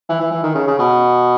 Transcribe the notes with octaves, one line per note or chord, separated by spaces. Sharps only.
E3
E3
E3
D#3
C#3
C#3
B2